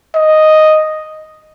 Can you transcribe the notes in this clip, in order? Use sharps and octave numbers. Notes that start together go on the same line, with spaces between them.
D#5